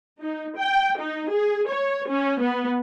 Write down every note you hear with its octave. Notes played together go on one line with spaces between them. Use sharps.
D#4
G5
D#4
G#4
C#5
C#4
B3